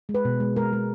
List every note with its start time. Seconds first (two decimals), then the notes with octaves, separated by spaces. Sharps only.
0.09 G#3
0.14 B4
0.25 B2
0.40 G#3
0.56 G#3 A#4
0.73 G#3